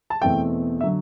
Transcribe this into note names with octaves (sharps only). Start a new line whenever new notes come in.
A5
E2 B2 A3 C4 G5
D3 F#3 E5